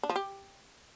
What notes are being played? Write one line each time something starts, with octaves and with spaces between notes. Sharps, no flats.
D4
F3
G4